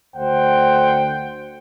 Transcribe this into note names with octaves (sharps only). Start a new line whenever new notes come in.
D2 D3 C5 F#5 G5